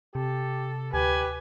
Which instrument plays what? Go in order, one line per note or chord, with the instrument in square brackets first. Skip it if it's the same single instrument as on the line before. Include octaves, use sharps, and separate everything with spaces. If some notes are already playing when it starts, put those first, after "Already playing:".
[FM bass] C3 [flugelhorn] G4 [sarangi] A4
[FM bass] D2 [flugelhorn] G4 [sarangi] B4 [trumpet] G#5